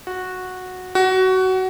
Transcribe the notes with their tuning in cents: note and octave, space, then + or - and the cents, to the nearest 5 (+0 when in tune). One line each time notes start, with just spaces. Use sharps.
F#4 -10
F#4 +20